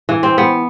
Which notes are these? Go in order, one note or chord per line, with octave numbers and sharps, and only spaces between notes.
E3
C4
B3